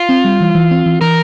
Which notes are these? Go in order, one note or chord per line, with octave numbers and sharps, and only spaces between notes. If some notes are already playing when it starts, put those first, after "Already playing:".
Already playing: F4
C4
G3
E3
E3
C4
E3
E3 A#4